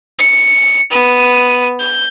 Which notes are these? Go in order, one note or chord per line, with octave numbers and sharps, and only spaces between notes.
C#7
B3 D#7
G6